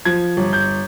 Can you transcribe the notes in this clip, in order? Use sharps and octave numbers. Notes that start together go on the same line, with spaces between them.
F3 G#6
G1
G6